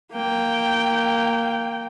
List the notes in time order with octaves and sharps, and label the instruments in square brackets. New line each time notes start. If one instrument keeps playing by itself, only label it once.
[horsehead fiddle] A#3 G5